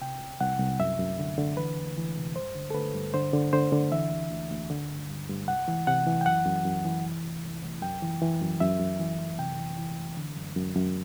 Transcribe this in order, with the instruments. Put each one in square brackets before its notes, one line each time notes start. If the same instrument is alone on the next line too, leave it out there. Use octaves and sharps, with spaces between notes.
[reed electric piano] C3 G5
C2
C2 F#5
C2
F#2 E5
F#2
D3
D3
E3 B4
E2
E3
C3
G2 C5
D3
A4
D3 B4
G2
D3 C5
D3
D3 C5
D3
E3 E5
D2
D2
D2
D3
G2
G2
G2
C2 F#5
E3
C3 F#5
E3
G5
F#2 F#5
F#2
F#2
E3
C2
C2
C2
C2
F#2 G5
E3
E3
F#2
F#2 E5
F#2
E3
F#2
C3 G5
E3
E3
C2
D3
F#2
F#2
F#2